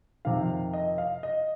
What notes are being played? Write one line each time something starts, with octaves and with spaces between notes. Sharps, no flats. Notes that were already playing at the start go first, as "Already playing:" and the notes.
F2 C3 D#3 F5
D#5
F5
D#5